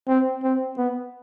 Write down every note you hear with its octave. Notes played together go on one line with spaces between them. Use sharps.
C4
C4
B3